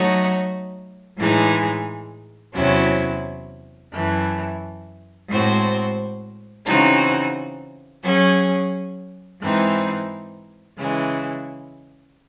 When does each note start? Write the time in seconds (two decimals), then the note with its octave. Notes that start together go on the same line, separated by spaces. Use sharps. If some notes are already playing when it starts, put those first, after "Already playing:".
Already playing: F#3 A3 D#4 F#4 C#5
1.17 A2 E3 G#3 D#4 G#4
2.54 E2 C3 F#3 C#4 E4
3.92 F#2 E3 A3
5.28 A2 G#3 C4 F#4 C5
6.66 C#3 E3 C4 D#4 F#4
8.03 F#3 C#4 G#4
9.41 G#2 E3 C4 D#4
10.78 C#3 E3 G#3